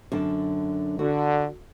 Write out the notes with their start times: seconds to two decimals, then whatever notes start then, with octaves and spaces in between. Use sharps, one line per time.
0.12 F#2 D3 A5
0.99 D3 F#4